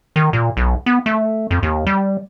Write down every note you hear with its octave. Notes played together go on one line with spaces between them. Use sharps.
D#3
A#2
B1
B3
A3
F2
D#2
G3